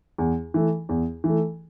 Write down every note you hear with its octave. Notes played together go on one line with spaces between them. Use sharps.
E2
E3 A3
E2
E3 A3